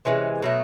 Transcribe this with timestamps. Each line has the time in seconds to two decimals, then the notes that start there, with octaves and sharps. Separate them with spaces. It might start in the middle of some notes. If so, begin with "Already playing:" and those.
0.05 C3 E3 G#3 C#4
0.42 B2 F#3 A3